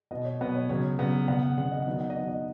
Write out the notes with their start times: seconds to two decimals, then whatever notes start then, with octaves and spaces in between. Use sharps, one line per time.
0.11 B2 B3 D#5
0.25 C#5
0.40 B2 B3 B4
0.56 C#5
0.69 C#3 F#3 B3 C#5
0.98 C#3 F#3 B3
1.28 C#3 B3 F#5
1.43 F#5
1.57 C#3 B3 F#5
1.72 D#5
1.82 F#5
1.87 D#3 F#3 B3 D#5
2.01 F#5
2.10 D#5
2.15 D#3 F#3 B3 F#5
2.29 D#5